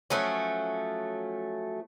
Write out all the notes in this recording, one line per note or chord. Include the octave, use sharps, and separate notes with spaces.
F3 F#3 A3 C#4